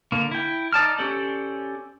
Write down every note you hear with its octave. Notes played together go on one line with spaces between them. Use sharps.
D3 A#3
E4 G5
D#4 D5 A5 F6
C#4 G4 A4 C5 D5